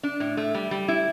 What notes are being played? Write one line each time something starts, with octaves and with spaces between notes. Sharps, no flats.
D4
A2
A3
G3
G3
E4